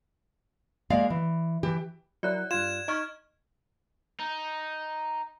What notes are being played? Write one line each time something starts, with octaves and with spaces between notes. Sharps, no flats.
G#3 A#3 D5 F5
E3
E3 G4
F#3 E4 A#4 D5 F#6
G2 F4 G#6 E7
D#4 D#5 C#6 F6
D#4